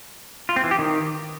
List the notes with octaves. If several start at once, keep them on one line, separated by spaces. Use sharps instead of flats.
F4
C4
E3
G4
D#3